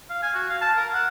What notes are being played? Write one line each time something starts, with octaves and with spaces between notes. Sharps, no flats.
F5
G#5
F#4
F5
A5
A#4
F#5